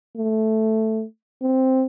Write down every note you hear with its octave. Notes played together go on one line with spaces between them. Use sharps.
A3
C4